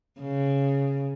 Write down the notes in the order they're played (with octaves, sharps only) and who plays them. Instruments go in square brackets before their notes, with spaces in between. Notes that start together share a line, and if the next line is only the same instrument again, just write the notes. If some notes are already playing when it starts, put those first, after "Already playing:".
[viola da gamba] C#3